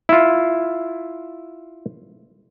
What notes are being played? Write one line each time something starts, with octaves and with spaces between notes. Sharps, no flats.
E4 F4